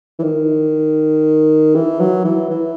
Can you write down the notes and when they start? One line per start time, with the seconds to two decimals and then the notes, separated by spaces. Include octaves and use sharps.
0.19 E3
0.23 D#3
1.75 E3
2.00 F#3
2.25 E3
2.50 E3